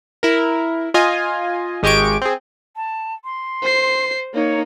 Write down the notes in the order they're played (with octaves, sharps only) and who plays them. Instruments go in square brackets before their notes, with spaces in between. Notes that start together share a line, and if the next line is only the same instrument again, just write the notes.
[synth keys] E4 A#4
F4 D#5 G#5
G#1 G#3 G4 D#5 C#6 D7
C4 G#4
[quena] A5
C6
[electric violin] C5 C7
[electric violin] A#3 D#4 [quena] C#5